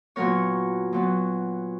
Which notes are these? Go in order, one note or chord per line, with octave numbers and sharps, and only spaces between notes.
A#2 F#3 B3 A#4 C#5
A#2 F#3 B3